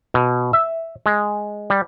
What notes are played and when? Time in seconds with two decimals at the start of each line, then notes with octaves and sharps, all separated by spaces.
0.14 B2
0.53 E5
1.06 G#3
1.70 G3